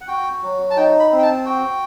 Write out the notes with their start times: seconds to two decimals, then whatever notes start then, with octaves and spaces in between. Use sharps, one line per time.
0.01 F#5
0.08 F#4 G5
0.43 F#3
0.70 A5
0.77 D#4 G5
1.00 B5
1.11 C4
1.18 G5
1.23 A5
1.45 F#4 G5